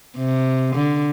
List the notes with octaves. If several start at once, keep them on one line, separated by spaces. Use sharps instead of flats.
C3
D3